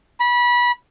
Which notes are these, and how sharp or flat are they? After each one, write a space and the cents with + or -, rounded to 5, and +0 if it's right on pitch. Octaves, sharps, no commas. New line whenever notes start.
B5 -25